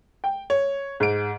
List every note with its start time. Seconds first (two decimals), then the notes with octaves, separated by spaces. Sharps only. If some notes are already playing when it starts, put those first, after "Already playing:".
0.24 G5
0.50 C#5
1.00 G#2 D7